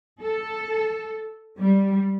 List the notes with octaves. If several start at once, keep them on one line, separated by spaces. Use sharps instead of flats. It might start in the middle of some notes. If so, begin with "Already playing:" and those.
A4
G3